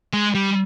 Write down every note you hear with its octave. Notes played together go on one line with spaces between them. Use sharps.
G#3
G3